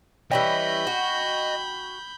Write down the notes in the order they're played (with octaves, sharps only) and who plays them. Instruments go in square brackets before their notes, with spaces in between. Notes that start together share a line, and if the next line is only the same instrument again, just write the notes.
[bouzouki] E3 G3 C#4 [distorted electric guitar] D#5 [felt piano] G5 [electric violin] B5 G6
[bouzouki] F#4